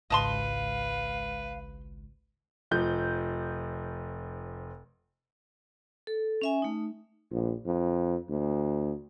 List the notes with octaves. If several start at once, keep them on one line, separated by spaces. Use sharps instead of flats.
G#1 C#2 B4 D#5 F5 A5 C6
F1 F3 G6
A4
C#4 E5 G#5
A3 D#4
A#1
F2
D2